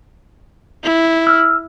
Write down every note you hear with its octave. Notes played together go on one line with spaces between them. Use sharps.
E4
E6 F6